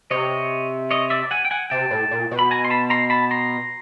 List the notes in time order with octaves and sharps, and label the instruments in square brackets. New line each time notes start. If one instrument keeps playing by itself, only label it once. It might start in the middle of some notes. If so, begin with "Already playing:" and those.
[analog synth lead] C3 [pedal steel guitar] C#5 D#5
[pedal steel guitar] C#5 D#5
D5 E5
F#5 G#5
G5
F#5 G#5
[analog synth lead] C3 [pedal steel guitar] G5 A5
[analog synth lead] A2
A#2
B2
[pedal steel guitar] B5
G#5 A#5
C6
A5 B5
A#5 C6
A5 B5
A#5 C6